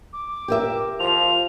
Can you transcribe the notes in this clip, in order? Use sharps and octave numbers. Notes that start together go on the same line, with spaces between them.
D6
G4 A#4 E5
F3 F7